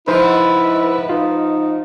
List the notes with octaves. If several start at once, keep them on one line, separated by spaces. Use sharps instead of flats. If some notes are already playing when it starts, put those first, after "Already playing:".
G#2 F3 D#4 E4 B4 C5
D#4 F4